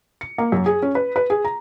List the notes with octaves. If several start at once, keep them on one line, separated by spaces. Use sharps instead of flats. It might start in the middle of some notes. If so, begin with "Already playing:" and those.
C#7
A#3
F#2
G#4
C#4
B4
B4
G#4
A#5